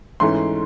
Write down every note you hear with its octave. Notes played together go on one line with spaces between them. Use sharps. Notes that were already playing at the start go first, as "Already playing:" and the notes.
G#2 E3 A3 C#4 C6